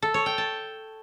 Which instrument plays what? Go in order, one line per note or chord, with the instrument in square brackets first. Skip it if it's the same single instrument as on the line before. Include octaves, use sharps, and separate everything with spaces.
[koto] A4
C#5
G5
A5